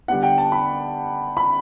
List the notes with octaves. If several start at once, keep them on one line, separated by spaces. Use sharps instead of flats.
D3 G3 B3 F#5
G5
A5
B5
B5